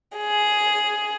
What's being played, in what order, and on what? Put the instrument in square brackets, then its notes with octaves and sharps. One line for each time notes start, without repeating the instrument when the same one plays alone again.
[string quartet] G#4